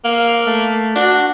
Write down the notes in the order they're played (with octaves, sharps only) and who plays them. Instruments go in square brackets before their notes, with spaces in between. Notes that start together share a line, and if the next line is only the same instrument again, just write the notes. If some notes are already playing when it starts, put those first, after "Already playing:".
[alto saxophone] A#3 [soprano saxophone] F5
[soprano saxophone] A3
[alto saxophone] D4 [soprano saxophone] F#4